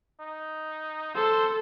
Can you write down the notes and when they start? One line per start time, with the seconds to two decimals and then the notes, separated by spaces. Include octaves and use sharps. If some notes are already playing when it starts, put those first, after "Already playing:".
0.20 D#4
1.15 A4 C5